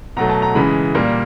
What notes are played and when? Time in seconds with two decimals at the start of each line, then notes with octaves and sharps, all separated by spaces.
0.17 B2 F#3 A3 A#5
0.29 A5
0.42 A#5
0.55 C#3 E3 G#3 B5
0.95 A#2 G3 A#3